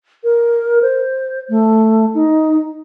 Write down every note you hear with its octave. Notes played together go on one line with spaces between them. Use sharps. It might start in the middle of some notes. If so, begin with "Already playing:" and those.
A#4
C5
A3
D#4